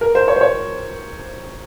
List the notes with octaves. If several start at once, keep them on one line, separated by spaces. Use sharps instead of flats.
A#4
C5
C#5
C5
C#5